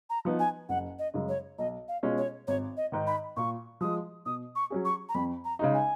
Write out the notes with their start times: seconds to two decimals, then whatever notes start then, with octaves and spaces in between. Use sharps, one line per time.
0.10 A#5
0.25 F3 B3 D#4
0.39 G#5
0.69 F#1 F#5
0.99 D#5
1.14 F#2 C#3 G#3
1.29 C#5
1.58 B1 D#5
1.88 F5
2.03 B2 G#3 C#4 F4
2.18 C#5
2.47 G#1 C#5
2.77 D#5
2.92 G#2 D#3
3.07 B5
3.37 A#2 C#6
3.81 F3 G#3 D#6
4.26 B2 D#6
4.56 C#6
4.70 F#3 C#4 G#4
4.85 C#6
5.09 A#5
5.15 F2 B5
5.45 A#5
5.59 C#3 G#3 D#4
5.74 G#5